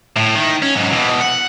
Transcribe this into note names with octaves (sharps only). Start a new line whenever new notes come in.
A2
D#3
C#4
G#2 F#3
B2 E3
F#5